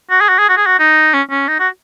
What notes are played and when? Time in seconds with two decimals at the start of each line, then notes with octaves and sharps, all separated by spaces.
0.11 F#4
0.21 G#4
0.29 F#4
0.39 G#4
0.49 F#4
0.57 G#4
0.66 F#4
0.79 D#4
1.14 C#4
1.30 C#4
1.48 D#4
1.60 F#4